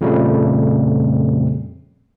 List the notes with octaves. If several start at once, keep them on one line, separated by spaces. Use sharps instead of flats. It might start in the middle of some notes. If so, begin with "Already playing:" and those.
F2 A#2 C#3 F3 G3 A3